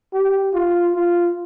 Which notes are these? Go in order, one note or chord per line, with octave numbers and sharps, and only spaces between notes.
G4
F4
F4